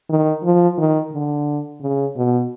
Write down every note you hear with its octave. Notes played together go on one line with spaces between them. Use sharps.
D#3
F3
D#3
D3
C#3
B2